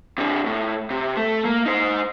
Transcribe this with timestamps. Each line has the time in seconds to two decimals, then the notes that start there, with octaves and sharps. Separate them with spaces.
0.18 C3 D4
0.46 A2
0.90 C3
1.17 A3
1.45 A#3
1.66 D#4 C5